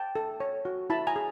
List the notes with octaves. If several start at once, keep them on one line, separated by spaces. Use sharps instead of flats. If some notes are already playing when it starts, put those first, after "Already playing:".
Already playing: G5 A5
A4
C#5
F#4
E4 A5 B5
G#5 A#5
G#4